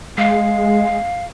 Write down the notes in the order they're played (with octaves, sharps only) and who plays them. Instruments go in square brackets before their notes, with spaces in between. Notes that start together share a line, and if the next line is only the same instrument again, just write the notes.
[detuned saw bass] G#3 [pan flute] F5